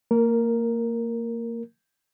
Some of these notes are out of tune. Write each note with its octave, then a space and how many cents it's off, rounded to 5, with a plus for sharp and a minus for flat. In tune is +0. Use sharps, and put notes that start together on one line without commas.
A#3 -25 A#4 +0